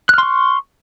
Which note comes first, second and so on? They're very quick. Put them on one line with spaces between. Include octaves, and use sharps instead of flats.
F#6 F6 C6 C#6